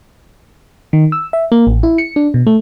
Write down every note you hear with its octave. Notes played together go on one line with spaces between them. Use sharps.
D#3
E6
E5
A#3
A1
E4
C#7
D4
B2
A3